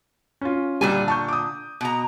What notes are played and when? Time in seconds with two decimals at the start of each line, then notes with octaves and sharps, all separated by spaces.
0.41 C#4 F4
0.81 A#2 D3 G3 G#5
1.08 A5 C#6 G6
1.28 D6 D#6
1.81 B2 A#5